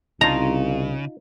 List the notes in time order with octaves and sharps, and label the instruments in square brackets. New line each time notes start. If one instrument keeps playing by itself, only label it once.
[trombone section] C2 [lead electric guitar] C#3 [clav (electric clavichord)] D#4 F4 [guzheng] A#5